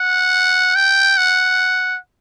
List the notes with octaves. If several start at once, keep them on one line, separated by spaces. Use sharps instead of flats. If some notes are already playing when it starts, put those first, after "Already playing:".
Already playing: F#5
G5
F#5